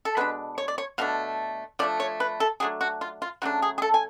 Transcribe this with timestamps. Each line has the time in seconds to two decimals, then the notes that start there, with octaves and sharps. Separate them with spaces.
0.05 A4
0.17 B2 G#3 D4 B4
0.58 C#5
0.68 D5
0.78 C#5
0.98 B2 A3 D4 F5
1.79 F3 A3 D4 D5
2.00 C#5
2.20 B4
2.40 A4
2.60 F#3 A3 D4 G#4
2.81 F#4
3.01 F4
3.22 F4
3.42 C#3 F#3 A3 D4 F#4
3.62 G#4
3.78 G#4
3.82 A4
3.94 G#5